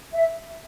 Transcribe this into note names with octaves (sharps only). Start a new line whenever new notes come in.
E5